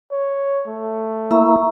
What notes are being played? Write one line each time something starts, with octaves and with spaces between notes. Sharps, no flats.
C#5
A3
A#3 E4 E5 A#5 C#6